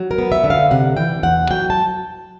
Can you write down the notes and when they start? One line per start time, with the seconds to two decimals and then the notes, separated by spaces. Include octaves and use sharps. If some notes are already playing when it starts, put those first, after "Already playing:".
Already playing: F#3
0.11 A#4
0.18 B3
0.32 E5
0.44 D3
0.50 F5
0.71 C3 F#5
0.97 E3 G5
1.23 E2 F#5
1.50 F#3 G5
1.70 A5